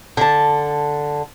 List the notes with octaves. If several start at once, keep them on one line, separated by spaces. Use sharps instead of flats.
D3 A5